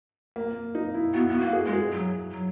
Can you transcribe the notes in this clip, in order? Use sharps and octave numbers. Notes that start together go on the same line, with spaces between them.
A#3
D#4
E4
B3 F#4
B3 F#4
A#3
G#4
G#3
G#4
F#3
F#3